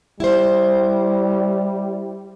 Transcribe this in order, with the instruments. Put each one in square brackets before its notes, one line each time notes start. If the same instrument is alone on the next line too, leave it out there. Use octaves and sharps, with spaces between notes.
[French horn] G3 [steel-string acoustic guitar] E4 C5